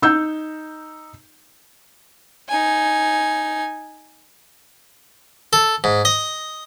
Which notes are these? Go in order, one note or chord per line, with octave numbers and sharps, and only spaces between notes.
D#4 E6 G6
D#4 G#5
A4
G#2
D#5